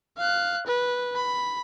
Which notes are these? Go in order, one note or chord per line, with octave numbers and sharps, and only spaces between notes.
F5 F#6
B4
B5